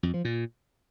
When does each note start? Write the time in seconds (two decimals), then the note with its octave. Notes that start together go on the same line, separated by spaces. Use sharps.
0.03 F2
0.14 F3
0.25 A#2